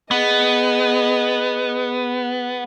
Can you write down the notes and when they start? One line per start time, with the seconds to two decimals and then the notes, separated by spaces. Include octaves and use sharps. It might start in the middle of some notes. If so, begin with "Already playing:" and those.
0.11 B3 G#4 D#5